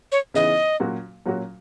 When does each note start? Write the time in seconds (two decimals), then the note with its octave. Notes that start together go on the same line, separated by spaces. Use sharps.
0.12 C#5
0.34 C#3 E3 B3 D#4 D#5
0.80 A#2 F#3 C#4 F#4
1.26 A#2 F#3 C#4 F#4